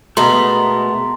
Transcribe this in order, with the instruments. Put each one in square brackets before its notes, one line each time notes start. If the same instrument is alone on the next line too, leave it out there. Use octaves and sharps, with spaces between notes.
[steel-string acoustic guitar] B2 G#3 [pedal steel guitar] A3 B3 [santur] A#4 [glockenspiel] C6